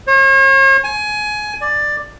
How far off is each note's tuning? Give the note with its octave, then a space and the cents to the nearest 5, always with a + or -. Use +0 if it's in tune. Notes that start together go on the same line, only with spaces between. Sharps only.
C#5 -45
G#5 +20
D5 +10